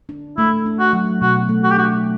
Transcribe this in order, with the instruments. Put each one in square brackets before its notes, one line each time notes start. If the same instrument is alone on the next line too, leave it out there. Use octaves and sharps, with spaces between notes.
[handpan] D4
[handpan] A3 [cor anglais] E4
[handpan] D4
[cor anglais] F#4
[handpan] F#3
[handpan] B2 [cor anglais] F#4
[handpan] A3
[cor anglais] F#4
G4
[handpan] D4 [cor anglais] F#4